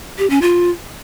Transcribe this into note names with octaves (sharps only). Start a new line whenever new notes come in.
G4
C#4
F4